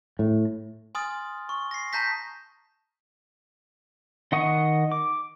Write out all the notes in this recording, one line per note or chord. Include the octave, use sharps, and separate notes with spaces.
A2
G#5 C6 D#6 F6 A6
C#6
A#6 C7
A5 A#5 G6 A#6 B6
D#3 D#5 F#5 C#6 D#6
D6